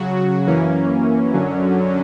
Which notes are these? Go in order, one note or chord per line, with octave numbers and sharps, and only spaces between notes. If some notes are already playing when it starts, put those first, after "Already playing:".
Already playing: C#3 F#3 F#4
F#2 E3 A#3 C#4
F#2 D3 F#3 C#4